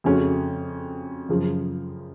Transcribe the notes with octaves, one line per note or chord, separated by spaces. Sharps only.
F2 C#3 A3 C#4 F#4
F#2 C#3 F3